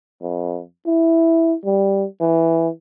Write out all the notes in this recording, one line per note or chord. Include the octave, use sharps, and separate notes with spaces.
F2
E4
G3
E3